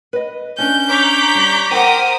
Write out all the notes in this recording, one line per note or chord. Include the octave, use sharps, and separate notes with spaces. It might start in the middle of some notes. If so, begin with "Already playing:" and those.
B4 D#5
C#4 D4 G6
C#5 A#5 D6 B6
G3
A#4 C5 F#5 G5 D#6